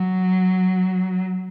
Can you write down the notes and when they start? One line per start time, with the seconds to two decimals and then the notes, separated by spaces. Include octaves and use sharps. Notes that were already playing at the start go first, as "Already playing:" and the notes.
Already playing: F#3